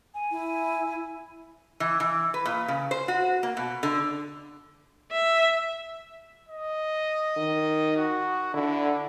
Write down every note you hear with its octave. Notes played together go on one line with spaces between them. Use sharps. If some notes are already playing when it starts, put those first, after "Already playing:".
G#5
E4
E3
E3
B4
A#2
C#3
C5
F#4
A#3
B2
D3
E5
D#5
D#3
F#4
D3 E4